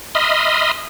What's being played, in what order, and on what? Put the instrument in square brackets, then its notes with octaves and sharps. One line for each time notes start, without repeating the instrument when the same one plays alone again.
[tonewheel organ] D#5 E5 B5 C6 D#6 F6